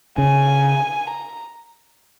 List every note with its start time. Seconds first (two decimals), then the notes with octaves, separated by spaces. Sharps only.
0.18 C#3 G#5
1.10 A#5